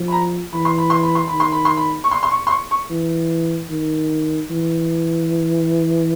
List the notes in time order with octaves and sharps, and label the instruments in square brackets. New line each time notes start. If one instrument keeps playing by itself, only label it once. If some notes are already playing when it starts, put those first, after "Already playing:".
Already playing: [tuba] F3
[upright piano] B5
A#5
[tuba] E3 [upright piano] B5
[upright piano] C6
B5
C6
B5
C6
[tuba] D#3 [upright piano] B5
[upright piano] C6
B5
C6
B5
C#6
C6
C6
C#6
C6
C#6
C#6
[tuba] E3
D#3
E3